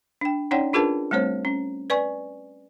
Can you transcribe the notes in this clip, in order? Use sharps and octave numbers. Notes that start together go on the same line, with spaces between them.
D4 G5
C#4 D#4 C#5 D5 F#5 G5
D4 F4 G#4 A#4 B4 A5
G3 A3 C4 C5 C#5
C#4
B4 D5 G#5 C#6